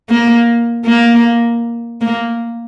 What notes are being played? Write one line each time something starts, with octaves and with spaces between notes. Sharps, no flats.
A#3
A#3
A#3